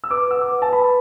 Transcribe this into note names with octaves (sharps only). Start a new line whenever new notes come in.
E6
B4 D6
F#5 E6
D6
B4
A5
B4 B5